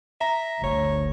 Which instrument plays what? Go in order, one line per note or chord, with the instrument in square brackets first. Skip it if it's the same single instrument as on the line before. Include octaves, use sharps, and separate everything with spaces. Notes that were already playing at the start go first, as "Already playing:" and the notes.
[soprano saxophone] E5 [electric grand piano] A#5
[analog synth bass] G1 [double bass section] D2 [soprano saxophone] C#5